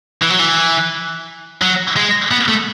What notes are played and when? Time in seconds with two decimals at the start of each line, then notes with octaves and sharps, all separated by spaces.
0.22 E3
0.30 F#3
0.39 E3
1.62 F#3
1.96 G#3
2.31 B3
2.48 A3